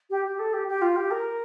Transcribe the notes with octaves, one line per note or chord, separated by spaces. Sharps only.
G4
G4
A4
G4
G4
F4
G4
A#4